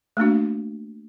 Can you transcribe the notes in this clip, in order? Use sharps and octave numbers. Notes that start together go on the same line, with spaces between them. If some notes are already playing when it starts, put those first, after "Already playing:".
A3 A#3 D4 F#4